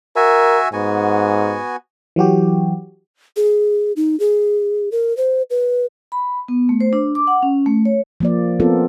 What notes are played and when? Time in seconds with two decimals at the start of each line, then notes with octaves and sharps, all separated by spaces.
0.16 F#4 A#4 E5 G#5
0.73 G#2 B3 F#4 G#5
2.16 E3 F#3 F#4 G4
3.37 G#4
3.96 D#4
4.20 G#4
4.92 A#4
5.17 C5
5.50 B4
6.12 B5
6.48 B3
6.69 A3
6.80 C5
6.93 D4
7.15 D6
7.27 F#5
7.43 C#4
7.66 A3
7.85 C#5
8.20 F3 A#3 D5
8.60 B3 C4 F4 A4 A#4